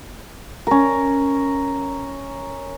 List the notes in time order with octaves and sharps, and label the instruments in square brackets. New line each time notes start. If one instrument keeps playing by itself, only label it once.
[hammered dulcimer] C#4 A#4